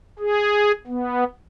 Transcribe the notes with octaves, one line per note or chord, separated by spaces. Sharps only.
G#4
B3